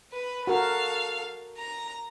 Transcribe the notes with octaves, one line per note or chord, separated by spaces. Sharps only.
B4
F#4 A4 A#4 F5
A#5